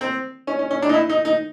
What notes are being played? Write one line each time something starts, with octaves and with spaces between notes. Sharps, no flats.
C4
C#4
C#4
C#4
D4
D#4
E4
D#4
D#4